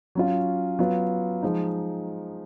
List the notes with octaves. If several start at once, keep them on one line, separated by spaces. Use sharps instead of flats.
F#3 C#4 F4
F#3 B3 F4
F3 G#3 D#4